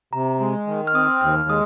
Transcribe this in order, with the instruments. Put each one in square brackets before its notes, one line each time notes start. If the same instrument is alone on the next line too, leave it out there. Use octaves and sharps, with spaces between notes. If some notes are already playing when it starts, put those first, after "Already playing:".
[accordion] C3 [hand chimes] A#5
[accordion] G#3
D#3
[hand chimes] F6
[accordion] C4 [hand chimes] D#6
[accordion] D#2 [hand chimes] F6
[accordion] G#3 [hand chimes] D#6